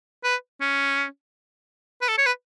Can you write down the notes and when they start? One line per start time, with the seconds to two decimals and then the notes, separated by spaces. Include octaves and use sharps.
0.24 B4
0.61 C#4
2.02 B4
2.09 A4
2.18 C#5
2.26 B4